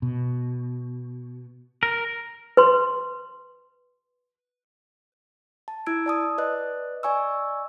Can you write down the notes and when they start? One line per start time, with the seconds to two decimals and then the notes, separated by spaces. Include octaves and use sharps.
0.02 B2
1.83 A#4
2.57 B4 C6
5.68 A5
5.86 E4 E6 G#6 D7
6.06 D5 A5 D#6
6.38 B4 D5 D#5 F#6
7.03 D5 D#5 G#5 C#6 E6